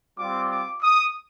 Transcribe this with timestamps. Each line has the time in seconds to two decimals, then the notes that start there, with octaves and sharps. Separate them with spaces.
0.18 G3 C4 F4 D6
0.50 D6
0.82 D#6